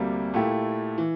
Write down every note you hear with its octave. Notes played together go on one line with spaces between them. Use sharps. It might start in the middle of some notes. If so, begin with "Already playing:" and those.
Already playing: D2 C3 G3 A#3
A#2 A3 E4 G4
E3